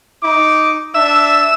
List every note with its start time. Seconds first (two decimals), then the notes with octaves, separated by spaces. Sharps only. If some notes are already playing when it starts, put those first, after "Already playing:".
0.22 D#4 D6
0.94 D4 E5 E6